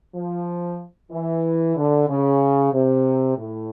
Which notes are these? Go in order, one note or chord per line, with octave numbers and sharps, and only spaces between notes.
F3
E3
D3
C#3
C3
A2